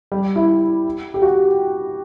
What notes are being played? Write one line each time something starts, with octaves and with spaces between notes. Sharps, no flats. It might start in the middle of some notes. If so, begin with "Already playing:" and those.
G3
E4
G4
F#4